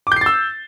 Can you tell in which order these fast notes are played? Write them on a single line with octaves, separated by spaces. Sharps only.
D6 G6 C7 A6 E6